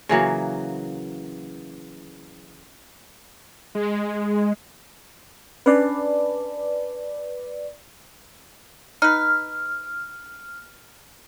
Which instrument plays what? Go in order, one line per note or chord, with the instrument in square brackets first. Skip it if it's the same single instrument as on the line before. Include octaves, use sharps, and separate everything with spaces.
[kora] C#3 E3 F#3 A#3
[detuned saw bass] G#3
[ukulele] C#4 D4 [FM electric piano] B4 D5
[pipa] D#4 B4 [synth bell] F6